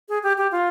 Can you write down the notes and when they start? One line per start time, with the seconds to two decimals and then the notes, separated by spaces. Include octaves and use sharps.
0.09 G#4
0.23 G4
0.38 G4
0.52 F4